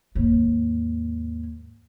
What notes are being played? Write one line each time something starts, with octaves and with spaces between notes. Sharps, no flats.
D#2 G#2